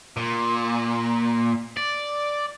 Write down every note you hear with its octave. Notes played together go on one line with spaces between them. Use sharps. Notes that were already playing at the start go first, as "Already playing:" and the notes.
A#2
D5